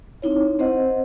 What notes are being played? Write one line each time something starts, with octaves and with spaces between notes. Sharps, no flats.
C4 D#4 E4 C#5
C4 C5 D#5 F#5